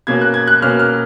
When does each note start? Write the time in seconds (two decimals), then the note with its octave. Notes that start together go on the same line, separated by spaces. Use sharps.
0.07 B2 A#3 C#4 G#6
0.21 F#6
0.34 G#6
0.48 F#6
0.62 B2 A#3 C#4 F6
0.79 F6